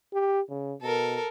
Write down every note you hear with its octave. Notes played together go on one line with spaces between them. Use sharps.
G4
C#3
B2 A4 A#4